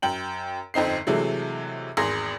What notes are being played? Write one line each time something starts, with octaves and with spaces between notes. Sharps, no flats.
F#2 G5 F#7
G1 F2 C4 D#4 C7
C3 E3 F#3 G#3 A3
G#1 E2 G#4 C6 A#6